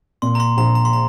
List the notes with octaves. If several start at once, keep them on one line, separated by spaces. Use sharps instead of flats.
A#2 C6
A#5
C6
A#1 A#5
A#5
C6
A#5